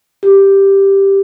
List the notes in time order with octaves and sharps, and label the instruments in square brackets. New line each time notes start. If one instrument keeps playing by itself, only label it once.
[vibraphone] G4